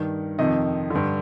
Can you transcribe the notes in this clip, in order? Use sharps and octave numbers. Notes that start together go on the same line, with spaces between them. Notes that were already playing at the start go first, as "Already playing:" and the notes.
Already playing: G2 D#3
F2 C3 D#3 D#5
G2 D3